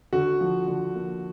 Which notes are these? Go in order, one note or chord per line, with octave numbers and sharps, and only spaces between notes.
D3 F#4
F3
D3
A#3